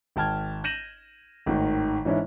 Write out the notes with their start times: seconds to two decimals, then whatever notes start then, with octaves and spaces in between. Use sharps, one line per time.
0.16 G#1 G5 A5 F6 G#6
0.64 G6 A#6 D#7 E7 F#7
1.46 G#1 A2 D#3
2.05 G#2 E3 C#4 D4 E4